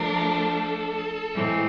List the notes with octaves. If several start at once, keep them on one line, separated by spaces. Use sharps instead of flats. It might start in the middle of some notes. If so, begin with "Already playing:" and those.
Already playing: F3 A3 D4 A#4
A4
A2 E3 G#3 C4